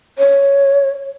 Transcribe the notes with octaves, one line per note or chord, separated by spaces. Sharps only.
C#5